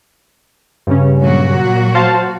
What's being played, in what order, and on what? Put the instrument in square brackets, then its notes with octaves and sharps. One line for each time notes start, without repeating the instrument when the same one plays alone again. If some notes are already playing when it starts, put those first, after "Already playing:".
[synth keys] G2 C#3 C#4
[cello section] A#2 F#3 F#4
[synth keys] C5 F5 A5